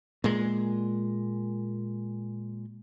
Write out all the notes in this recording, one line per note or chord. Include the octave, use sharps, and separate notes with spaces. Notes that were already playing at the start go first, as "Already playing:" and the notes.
A#2 G#3